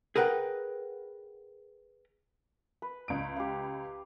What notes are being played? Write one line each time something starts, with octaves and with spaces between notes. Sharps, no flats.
G#4 A#4 B4 F#5 G5
B4
C#2 D7
G4 F5